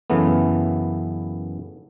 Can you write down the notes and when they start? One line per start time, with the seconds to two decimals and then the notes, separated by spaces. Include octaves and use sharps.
0.10 F#2 C#3 E3 A3 B3